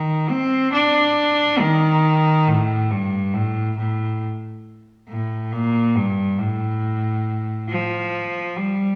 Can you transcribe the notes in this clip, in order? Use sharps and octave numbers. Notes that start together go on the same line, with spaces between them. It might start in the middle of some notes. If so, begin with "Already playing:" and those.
Already playing: D#3
C4
D4
D#3
A2
G2
A2
A2
A2
A#2
G2
A2
F3
G3